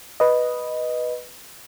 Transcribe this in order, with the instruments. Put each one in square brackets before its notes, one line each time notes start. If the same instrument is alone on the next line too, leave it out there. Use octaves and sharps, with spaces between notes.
[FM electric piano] B4 D#5